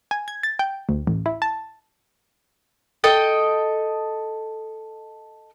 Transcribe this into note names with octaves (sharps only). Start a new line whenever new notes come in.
G#5
G#6
A6
G5
D2
A1
E4
A5
A4 D#5 G5